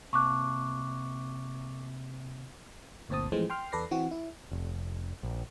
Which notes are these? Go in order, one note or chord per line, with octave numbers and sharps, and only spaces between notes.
C3 A#3 A5 C#6 D6 F#6
G1 D2 A#2 C4 A5 D#6
A2 E3 F3 G#3 C4
G5 C6 F6
E2 A4 B4 D5 A#6 C7
E3 C4 F#4
E4
F1
A#1